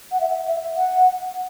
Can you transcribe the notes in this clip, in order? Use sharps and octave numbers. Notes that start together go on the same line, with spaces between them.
F#5
E5
E5
F#5